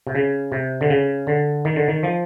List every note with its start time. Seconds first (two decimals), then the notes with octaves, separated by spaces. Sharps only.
0.07 C3
0.15 C#3
0.52 C3
0.81 D3
0.90 C#3
1.27 D3
1.65 D#3
1.76 D3
1.88 D#3
2.03 F3